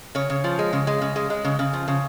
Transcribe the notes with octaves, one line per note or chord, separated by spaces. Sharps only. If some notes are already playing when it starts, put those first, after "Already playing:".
C#3 C#5
C#3
F3
G#3
C#3
G#3
C#3
G#3
G#3
C#3
C#3
F3
C#3